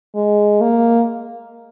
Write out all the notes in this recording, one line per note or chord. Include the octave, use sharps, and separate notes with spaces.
G#3
A#3